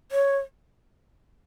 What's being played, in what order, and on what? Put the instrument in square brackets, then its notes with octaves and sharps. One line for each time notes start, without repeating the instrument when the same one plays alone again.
[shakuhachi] C#5